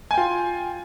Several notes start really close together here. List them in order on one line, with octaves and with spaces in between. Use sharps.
G#5 G5 F4